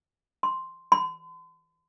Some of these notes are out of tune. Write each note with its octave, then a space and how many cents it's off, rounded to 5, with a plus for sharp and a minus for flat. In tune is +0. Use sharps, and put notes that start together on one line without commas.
C6 +0
C6 -45